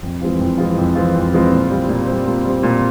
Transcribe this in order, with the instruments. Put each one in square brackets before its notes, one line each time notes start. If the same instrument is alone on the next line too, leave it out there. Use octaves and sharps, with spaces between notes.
[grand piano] F2
E3 G#3 C4 F4
F2
E3 G#3 C4 F4
F2
E3 G#3 C4 F4
F2
E3 G#3 C4 F4
A#2
G3 C4
A#2
G3 C4
A#2
G3 C4
A#2